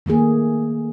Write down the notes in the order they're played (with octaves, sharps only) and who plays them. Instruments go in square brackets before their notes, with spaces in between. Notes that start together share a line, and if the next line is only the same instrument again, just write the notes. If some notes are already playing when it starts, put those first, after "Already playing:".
[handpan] D#3 A3 A#3 G#4